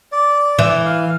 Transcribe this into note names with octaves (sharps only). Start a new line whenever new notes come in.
D5
E3
F5